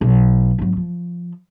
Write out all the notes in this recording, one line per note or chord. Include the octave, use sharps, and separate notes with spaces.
B1
G#1 F#3
F3